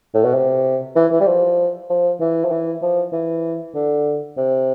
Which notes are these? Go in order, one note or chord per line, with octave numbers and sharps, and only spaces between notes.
A2
B2
C3
E3
E3
G3
F3
F3
E3
F3
E3
F3
E3
D3
C3